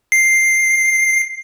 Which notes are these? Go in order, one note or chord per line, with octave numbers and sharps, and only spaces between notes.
C7